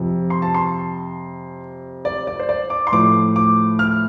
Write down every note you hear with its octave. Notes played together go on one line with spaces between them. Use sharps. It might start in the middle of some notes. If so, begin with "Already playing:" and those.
Already playing: F2 C3 F3
C6
A5
C6
D5
D5
C5
D5
D6
C6
A2 F3 A3 D6
D6
F6